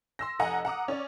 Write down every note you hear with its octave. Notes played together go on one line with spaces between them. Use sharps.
C6 E6 A#6
F1 D#5 F#5 G#5 A#5
F#5 A#5 D6 D#6
C#4 D5